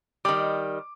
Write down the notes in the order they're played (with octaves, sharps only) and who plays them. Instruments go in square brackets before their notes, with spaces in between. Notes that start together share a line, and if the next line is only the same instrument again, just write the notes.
[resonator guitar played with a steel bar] D#3 G3 [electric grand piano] D6